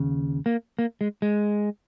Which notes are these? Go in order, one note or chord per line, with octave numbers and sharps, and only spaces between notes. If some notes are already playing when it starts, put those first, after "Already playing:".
Already playing: D#2 C#3
A#3
A#3
G#3
G#3